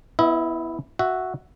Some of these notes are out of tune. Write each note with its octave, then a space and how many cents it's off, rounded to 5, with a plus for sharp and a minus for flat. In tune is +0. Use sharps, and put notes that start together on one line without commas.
B3 +0 E4 +0 D#5 +45
F#4 +0 E5 +0